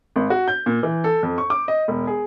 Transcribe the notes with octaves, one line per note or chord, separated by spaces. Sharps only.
G#1
F#4
G6
A#2
E3
A4
F2
C#6
D6
D#5
E1
G#4